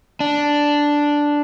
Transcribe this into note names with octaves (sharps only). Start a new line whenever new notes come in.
D4